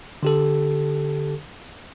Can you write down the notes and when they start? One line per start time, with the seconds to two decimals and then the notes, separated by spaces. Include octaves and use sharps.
0.23 D3 G4 A4